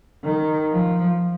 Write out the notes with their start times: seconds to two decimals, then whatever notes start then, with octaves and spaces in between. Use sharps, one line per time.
0.24 D#3
0.71 F3